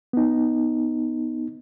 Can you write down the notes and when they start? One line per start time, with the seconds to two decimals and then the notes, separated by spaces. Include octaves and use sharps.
0.13 B3 D#4